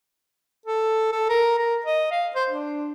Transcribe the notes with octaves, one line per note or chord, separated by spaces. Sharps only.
A4
A4
A#4
A#4
D#5
F5
C5
D4